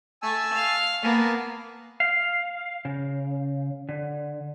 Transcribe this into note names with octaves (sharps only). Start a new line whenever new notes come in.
A3 G#5 A5 E6
F5
A#3 B3 F5 G#5 A5
F5
C#3
D3